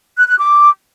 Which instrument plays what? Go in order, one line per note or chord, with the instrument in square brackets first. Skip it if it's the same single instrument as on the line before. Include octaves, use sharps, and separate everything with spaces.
[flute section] F#6
F#6
D6